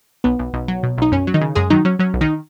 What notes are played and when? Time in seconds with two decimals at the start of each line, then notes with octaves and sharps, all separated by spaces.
0.24 B1 B3
0.39 B1
0.53 B1
0.68 F#3
0.83 B2
0.98 B1 D#4
1.12 F#2 C#4
1.27 F#3
1.34 D#3 D#4
1.41 C#3
1.55 F#2 G#3 G#4
1.70 D#3 F#3 D#4
1.85 F#3 C#4
1.99 F#3 C#4
2.14 B1
2.21 D#3 D#4